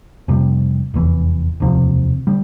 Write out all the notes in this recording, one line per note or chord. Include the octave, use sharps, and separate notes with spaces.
F2 C3 G3
F1 E2 E3
E1 D2 C3 F3
D3 G3